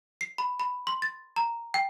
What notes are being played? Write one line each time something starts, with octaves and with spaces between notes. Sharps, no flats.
C7
B5
B5
C6
A6
A#5
G5